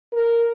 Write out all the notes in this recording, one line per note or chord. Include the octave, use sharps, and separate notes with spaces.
A#4